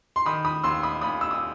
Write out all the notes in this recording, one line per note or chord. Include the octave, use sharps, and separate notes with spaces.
C6
D#3 B5 D#6
B5 D#6
D#2 C6 E6
B5 D#6
D#2 B5 D#6
E6
D#6